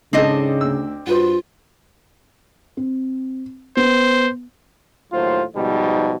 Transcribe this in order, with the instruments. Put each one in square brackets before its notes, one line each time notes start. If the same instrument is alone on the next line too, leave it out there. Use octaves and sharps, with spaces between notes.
[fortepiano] G#2 D#4 A4 [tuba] C#3 [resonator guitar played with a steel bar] C4 D4 D#5
[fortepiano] D2 E6
[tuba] G2 [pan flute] F4 [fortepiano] F#4 B4 C5
[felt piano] C4
[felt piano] B3 [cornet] C5
[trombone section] D#2 A2 F#3 F4 C5
G#2 B2 F3 G3 D#4